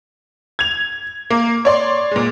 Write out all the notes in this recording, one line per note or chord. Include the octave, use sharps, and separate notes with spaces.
G#6 F7
A#3
C#5 D5 C6
A#2 G#3